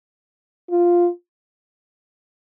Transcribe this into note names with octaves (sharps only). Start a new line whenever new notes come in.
F4